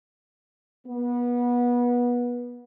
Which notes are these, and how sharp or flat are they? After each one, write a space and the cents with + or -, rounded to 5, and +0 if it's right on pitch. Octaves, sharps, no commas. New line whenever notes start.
B3 -25